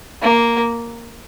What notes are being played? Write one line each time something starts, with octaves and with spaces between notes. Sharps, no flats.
A#3